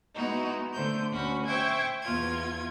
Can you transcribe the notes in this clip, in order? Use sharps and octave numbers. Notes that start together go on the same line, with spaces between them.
G#3 B3 D#4 E4 F#4
D3 A3 C5 G6
D2 C#4 F#4 B5
C5 E5 G5 C#6 G#6
E2 F4 G#6